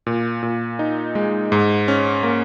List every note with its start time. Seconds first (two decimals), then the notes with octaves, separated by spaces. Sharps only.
0.06 A#2
0.43 A#2
0.79 D#4
1.15 G#3
1.52 G#2
1.88 C#4
2.23 A#3